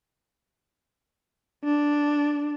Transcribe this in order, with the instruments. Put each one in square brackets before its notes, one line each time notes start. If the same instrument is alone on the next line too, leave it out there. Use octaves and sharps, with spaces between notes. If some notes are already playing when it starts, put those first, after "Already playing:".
[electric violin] D4